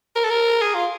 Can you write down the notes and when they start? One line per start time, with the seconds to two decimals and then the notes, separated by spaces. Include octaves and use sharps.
0.16 A#4
0.24 A4
0.30 A#4
0.61 G#4
0.74 F4